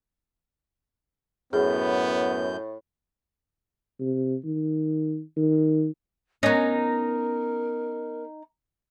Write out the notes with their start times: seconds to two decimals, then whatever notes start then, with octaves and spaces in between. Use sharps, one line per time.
1.53 F#2 A2 B3 G#4 G6
4.00 C3
4.44 D#3
5.37 D#3
6.43 B3 C#4 D#4 A#4 A#5